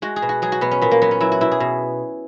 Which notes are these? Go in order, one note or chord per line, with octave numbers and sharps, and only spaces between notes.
G#3 F#4
G#4
B2
F#4
F#3 G#4
F#4
B2 B3
C#4
A#2 B3
A#3
F#3 B3
C#4
F#3 E4
F#4
B2 E4
G#4
B2